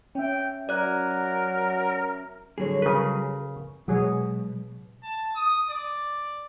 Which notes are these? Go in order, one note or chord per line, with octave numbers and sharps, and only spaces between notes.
C#4 E5 G5
F#3 A#4 D5 F#6
D3 F#3 G3 G#4 C#5
C#3 A#4 B4
B2 F#3 G#3 F#4 G#4 C#5
A5
D#6
D5